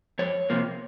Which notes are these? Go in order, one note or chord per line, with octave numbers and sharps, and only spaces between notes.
F2 C#5
C3 F3 A#3